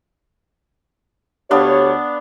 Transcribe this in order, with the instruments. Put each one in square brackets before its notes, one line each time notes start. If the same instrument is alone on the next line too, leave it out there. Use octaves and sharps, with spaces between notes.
[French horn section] D2 G4 C#5 [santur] B3 D4 F5